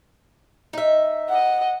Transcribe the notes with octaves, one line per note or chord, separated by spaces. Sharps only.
D#4 E5
D#5 F#5